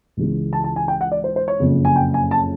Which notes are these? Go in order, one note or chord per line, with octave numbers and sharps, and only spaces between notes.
C#2 C#3 E3 G#3
A5
A5
G#5
G5
F#5
D5
C5
C5
C#5
F#1 F2 C#3
G#5
G5
G#5
A5